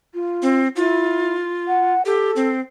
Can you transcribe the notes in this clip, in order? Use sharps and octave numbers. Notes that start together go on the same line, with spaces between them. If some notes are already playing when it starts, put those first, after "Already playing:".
F4
C4
E4 F4
F#5
G4 A4
C4